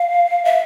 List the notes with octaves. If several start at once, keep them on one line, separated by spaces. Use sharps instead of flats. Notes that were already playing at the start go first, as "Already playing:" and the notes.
Already playing: F5
E5